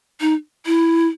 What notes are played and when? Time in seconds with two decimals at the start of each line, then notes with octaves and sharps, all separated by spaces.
0.21 D#4
0.66 E4